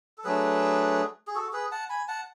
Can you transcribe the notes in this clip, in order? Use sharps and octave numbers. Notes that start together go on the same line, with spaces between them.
A4
F#3 A3 D4 G#4 B4
G#4
F#4 A4
G#4 B4
F#5 A5
G#5 B5
F#5 A5